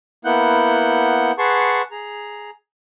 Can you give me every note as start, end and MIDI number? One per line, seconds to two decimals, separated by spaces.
0.25 1.32 58
0.25 1.32 59
0.25 1.32 64
0.25 1.32 78
0.25 1.32 90
0.25 1.32 91
1.38 1.82 68
1.38 1.82 71
1.38 1.82 78
1.38 1.82 81
1.38 1.82 84
1.38 1.82 85
1.91 2.50 68
1.91 2.50 82